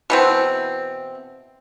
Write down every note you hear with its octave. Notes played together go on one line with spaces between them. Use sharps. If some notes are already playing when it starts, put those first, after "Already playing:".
B2 E3 C4